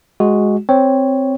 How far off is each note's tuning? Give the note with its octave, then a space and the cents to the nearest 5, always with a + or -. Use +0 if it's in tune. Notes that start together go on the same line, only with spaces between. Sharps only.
G#3 +0 F#4 +0
C4 +0 C#5 +0